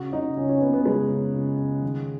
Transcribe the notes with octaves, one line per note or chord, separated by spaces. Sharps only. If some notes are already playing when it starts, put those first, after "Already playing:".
Already playing: C#3 F#4
C#3 D#4
C#2 C#4
C#4
C#2 B3
B3
C#3 G#3
C#3
C#2
C#2
D#3